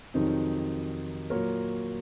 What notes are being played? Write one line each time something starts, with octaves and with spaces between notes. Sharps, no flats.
F2 C3 D#3 F#3 C4 D#4
A#2 F#3 A#4 C#5